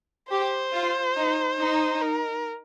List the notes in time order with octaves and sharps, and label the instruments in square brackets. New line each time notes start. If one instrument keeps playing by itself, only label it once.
[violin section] G4 [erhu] C5
[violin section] F4
D#4
D#4
[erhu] A#4